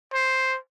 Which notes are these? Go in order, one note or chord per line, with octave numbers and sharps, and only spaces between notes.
C5